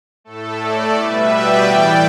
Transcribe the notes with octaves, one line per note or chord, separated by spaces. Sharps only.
A2 A3 A4
A4 D5
B2 G3 B4 E5
D5 G5
A2 E3 G3